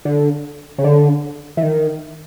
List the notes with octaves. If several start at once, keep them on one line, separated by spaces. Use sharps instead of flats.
D3
C#3
D3
E3
D#3